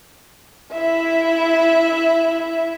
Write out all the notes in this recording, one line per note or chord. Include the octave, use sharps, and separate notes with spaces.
E4 E5